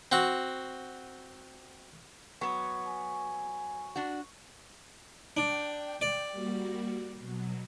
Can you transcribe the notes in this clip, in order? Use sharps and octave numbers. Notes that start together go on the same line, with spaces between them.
C4 F#4
F#3 B3 C#6
G#5
D4 F#4
D4 G5
D5
G3 A#3 F#4
B2 F#3